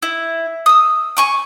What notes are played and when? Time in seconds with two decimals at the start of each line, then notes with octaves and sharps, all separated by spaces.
0.03 E4
0.66 D#6 E6
1.17 G#5 C#6 D6